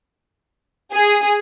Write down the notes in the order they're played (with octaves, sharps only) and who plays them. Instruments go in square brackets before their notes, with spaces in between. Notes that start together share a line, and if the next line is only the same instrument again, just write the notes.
[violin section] G#4